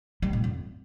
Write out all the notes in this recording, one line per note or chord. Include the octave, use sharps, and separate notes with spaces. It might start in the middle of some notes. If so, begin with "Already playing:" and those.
G3
A#2
F2